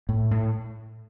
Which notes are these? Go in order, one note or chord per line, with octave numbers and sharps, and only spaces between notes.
A2
A2